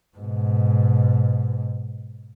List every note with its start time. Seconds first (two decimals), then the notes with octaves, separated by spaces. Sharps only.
0.18 G#2 B2